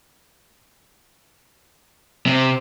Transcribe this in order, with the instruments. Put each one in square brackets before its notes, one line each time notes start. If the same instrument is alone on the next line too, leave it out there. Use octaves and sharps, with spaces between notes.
[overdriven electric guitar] C3